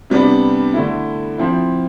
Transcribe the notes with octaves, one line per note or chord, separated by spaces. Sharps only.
C3 G3 B3 D4
D3 A3 E4
F3 C4 E4